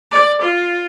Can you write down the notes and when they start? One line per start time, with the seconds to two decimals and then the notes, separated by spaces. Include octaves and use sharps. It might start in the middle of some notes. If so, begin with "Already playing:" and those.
0.11 D5
0.42 F4